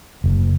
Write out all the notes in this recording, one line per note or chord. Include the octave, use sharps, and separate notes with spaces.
F#1